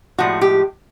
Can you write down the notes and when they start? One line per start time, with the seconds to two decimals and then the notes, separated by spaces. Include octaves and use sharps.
0.18 A2 F3 G#3 F#4
0.41 G4